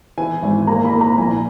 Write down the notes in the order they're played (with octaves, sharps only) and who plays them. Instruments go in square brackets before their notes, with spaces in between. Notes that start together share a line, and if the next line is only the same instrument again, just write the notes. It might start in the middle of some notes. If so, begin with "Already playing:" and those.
[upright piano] E3 G#5
G#1
A#3 A#5
B5
A#3
A#5
A#1 G#5